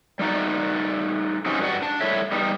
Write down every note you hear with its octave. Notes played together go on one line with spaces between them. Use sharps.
G3 A3 D#4 F#4 D5
F#3 C4 C#4 D#4 G4
G2 G3 F#4 D5 F#5
D4 A5
G3 E4 A4 C#5 E5
G3 B3 D#4